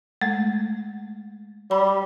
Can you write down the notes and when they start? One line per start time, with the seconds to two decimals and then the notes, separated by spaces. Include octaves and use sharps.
0.21 G#3 A3
1.71 G3 B5